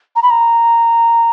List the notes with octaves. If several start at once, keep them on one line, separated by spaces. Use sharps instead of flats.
A#5
B5
A#5